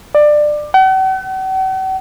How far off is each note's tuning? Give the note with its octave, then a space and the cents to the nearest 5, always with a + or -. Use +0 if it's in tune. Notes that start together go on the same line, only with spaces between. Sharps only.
D5 +20
F#5 +45